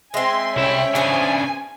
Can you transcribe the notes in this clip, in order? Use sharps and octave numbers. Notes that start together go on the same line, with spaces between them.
G#3 C4 E5 G#5 C6
C2 C#4 E4 C#5 G5
C#3 B3 D4 C5 G#5